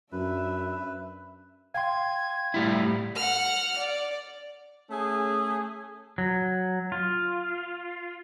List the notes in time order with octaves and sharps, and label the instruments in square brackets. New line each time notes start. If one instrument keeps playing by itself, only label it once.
[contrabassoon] F#2 [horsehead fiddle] D4 E5 [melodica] B4
[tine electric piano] F5 G5 C6 [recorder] G#6
[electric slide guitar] A2 G3 E4
[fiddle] F#5 F6
D5
[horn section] A3 C#4 G#4
[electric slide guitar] F#3
F4